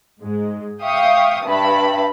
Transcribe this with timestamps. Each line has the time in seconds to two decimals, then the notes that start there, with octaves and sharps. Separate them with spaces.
0.21 G#2 G#3
0.82 E5 F5 G5 C#6 D#6
1.45 G2 E5 A5 B5